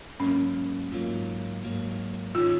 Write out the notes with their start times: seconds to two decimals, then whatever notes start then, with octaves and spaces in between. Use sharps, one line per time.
0.20 G#2 F#3 A#3 C#4
0.91 G#2 F#3 A#3 F4
1.63 G#2 F#3 A#3
2.35 D#3 G#3 C#4 F4